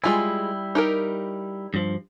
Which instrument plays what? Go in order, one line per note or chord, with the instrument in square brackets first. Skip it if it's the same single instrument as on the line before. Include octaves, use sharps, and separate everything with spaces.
[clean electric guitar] G3 E4 [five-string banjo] G#3 F4 G#5
[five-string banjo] D#4 G4 A#4
[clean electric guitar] G2 F3